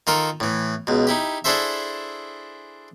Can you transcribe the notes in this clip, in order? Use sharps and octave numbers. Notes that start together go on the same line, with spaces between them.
D#3 F4 A4 A#4
A2 E3
C#2 B2
D#4 E4 G4
D4 E4 G#4 A4 C5 E5